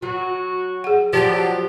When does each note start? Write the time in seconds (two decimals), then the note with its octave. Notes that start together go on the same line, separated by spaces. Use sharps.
0.02 F#3 F#4
0.84 G#4 F#5
1.13 F3 F#3 G4 C5 D5 A5